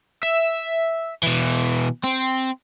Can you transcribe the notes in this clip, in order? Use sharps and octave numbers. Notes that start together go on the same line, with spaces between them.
E5
B2 E3
C4